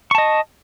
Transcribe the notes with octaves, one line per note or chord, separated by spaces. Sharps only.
D#5 A5 C#6